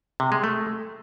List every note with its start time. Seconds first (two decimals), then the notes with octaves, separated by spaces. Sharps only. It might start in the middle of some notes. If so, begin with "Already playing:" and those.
0.20 C3
0.32 G#3
0.44 A3